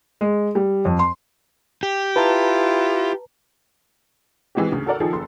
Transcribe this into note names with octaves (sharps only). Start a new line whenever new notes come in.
G#3
G3
F2
C6
G4
E4 F4 B4 A5 A#5
E3 G#3 C4 F#4 G4
D2 C#3
F#4 A4 A#4 D5 F#5
D#3 F3 G#4 A4
F#1 A4 C6